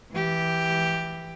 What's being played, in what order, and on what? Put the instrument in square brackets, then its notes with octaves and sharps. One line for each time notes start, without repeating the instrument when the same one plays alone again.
[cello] E3 G4